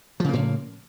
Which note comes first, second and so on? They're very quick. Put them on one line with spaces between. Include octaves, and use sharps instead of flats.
F3 C#3 A#3 A2